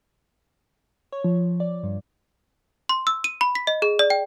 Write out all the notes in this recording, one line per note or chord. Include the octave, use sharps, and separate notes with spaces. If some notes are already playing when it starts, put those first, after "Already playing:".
C#5
F3
D5
G2
C6
E6
D#7
B5
B6
D#5
G#4
D5
G5